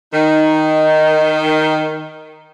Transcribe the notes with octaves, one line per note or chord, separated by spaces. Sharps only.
D#3 D#4